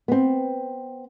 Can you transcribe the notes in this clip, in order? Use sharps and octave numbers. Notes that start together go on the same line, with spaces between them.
B3 C4